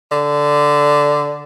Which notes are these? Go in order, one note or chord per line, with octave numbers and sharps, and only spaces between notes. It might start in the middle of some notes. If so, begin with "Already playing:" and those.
D3